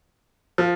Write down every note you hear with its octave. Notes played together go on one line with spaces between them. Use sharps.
F3